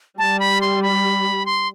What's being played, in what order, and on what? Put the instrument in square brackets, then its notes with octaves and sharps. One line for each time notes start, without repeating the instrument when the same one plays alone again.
[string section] G3 [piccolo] A5
[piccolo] B5
C6
B5
C6